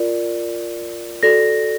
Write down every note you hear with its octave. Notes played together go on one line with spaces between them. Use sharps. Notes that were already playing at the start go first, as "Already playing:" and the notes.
Already playing: F4 A#4 D5
F#4 A4 D5 A#6